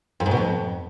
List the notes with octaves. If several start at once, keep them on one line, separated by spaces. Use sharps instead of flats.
F2
G#2
B2
F2